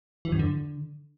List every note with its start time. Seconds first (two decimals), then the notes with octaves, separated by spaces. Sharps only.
0.25 E3
0.32 F#2
0.39 D3